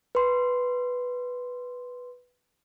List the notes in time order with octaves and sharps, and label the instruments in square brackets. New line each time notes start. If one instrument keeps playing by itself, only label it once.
[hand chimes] B4 C6